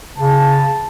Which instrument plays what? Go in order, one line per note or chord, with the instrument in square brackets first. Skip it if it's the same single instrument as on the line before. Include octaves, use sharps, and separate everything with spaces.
[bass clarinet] C#3 [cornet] A5